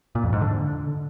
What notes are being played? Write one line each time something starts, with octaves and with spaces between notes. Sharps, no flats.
A#2
F2
G#2
D3